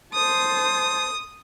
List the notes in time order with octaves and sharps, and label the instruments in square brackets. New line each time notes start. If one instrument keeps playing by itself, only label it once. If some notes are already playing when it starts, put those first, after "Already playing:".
[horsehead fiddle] C5 A5 [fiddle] D#6